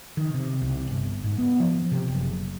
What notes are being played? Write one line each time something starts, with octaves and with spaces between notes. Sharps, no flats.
D#3
C3
C2
G1
G#2
B3
F3
C3
F#1